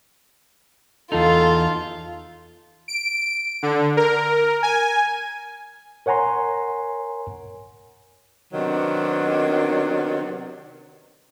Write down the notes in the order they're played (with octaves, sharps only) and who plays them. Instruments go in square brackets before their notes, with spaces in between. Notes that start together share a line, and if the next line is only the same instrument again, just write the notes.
[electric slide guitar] E2 D#4 [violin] F4 [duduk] A4
[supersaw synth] D7
D3
A#4
G#5
[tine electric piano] A#4 C#5 F#5 G#5 A#5 C6
[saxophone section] C3 D#3 F#3 B3 D4